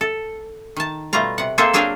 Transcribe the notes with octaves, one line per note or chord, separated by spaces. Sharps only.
A4
D#3 A5
B2 G3 A3 F4 A#5
C3 F#5
A#3 C4 G#4 A4 C5 E5
F#3 D4 G#4 A#4 F5 G5